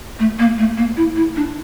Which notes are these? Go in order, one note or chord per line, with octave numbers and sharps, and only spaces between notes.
A3
A#3
A3
A#3
E4
E4
D4